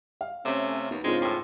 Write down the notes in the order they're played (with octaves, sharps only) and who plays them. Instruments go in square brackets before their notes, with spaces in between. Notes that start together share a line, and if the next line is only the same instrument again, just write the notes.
[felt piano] F5
[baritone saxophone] C3 [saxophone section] A3 C#4
[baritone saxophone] D#2 [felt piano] B3
[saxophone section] G#2 C#3 C4 [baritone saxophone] G#3 [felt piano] D4 D#4 A#4 [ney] F4
[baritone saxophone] A2 [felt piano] G5 C6 E6